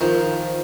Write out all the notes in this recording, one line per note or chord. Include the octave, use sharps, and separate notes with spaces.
D#3 F3